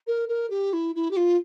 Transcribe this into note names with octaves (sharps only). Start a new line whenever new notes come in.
A#4
A#4
G4
E4
E4
G4
F4